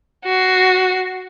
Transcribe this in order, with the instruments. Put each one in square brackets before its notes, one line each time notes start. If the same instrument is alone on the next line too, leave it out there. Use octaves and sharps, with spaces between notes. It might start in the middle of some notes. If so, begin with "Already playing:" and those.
[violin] F#4 C7